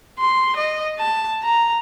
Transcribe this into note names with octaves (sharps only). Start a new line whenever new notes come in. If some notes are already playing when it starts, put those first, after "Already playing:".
C6
D#5
A5
A#5